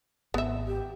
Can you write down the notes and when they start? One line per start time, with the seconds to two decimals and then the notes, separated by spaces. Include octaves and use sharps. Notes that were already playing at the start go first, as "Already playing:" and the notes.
0.34 G#1 B3 E5
0.67 G4